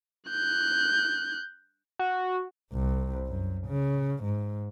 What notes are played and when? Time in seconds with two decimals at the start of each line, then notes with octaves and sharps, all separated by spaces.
0.30 F#6 G6
1.99 F#4
2.73 C2
3.26 F#2
3.67 C#3
4.24 G#2